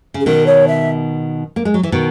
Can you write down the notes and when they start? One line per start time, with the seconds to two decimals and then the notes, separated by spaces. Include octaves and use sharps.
0.14 C#3
0.21 G#4
0.26 B2 D#3 A#4
0.47 C#5
0.68 E5
1.56 A#3
1.65 G#3
1.74 F#3
1.83 E3
1.92 B2 D#3